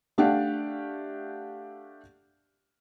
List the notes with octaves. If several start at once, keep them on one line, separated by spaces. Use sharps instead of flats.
A3 D4 G4 D5 F5 F#5